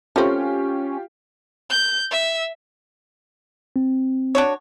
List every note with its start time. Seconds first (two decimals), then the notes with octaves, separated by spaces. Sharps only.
0.16 A3 C4 C#4 F4 G4
1.70 G6
2.11 E5
3.76 C4
4.35 D4 F#4 C#5